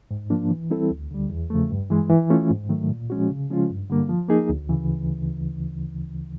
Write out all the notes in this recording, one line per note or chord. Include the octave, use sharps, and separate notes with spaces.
G#2
F3 A#3 D4
E3
G3 C4 E4 A4
D2
D3 G3
E2
C#3 F3 A3
G2
E3 G#3
E3
A3 C#4 F4
G#2
D#3 F#3 A3
A#2
F3 G#3 C#4 F#4
C#3
F3 G#3 C#4 F4
G2
D3 G3 A#3
F3
A#3 D#4 G#4
D2
C#3 E3